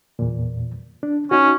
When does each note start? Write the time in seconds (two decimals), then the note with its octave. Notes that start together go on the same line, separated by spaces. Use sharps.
0.19 E2 A#2
1.03 D4
1.31 C#4 D#4 F#4